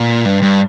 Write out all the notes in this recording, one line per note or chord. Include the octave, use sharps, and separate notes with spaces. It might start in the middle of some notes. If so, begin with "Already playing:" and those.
Already playing: A#2
G2
G2